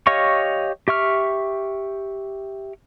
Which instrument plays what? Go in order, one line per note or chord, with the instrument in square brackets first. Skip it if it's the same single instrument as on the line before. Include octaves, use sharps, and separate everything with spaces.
[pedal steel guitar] G4 C#5 D#5 F5 C#6
G4 E5 C#6 F6